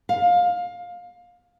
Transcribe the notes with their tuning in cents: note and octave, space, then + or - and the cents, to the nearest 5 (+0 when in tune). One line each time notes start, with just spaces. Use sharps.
F5 +20